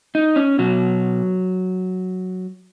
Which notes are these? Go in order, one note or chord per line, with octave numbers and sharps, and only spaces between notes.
D#4
C#4
B2 F#3